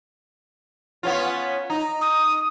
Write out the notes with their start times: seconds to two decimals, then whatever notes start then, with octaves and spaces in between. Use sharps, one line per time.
1.03 B3 C#4 F4
1.70 D#4
2.01 D#6